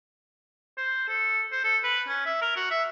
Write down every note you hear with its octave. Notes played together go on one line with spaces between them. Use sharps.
C5
A4
C5
A4
B4
C#4
E5
A#4
F#4
E5